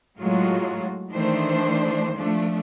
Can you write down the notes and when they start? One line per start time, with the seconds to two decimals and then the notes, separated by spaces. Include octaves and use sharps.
0.18 A2 F#3 G#3 F4 F#4
1.10 D#3 E3 A3 D4 C5
2.14 F3 A3 D4